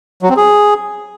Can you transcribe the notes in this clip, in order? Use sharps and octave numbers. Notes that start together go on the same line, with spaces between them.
F#3
C4
G#4